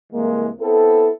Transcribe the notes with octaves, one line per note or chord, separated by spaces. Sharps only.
C2 E3 G#3 A#3
B3 C4 E4 A4